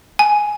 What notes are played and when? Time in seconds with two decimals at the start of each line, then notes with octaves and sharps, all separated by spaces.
0.19 G#5